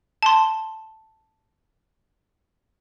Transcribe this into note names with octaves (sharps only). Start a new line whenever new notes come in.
A5 C6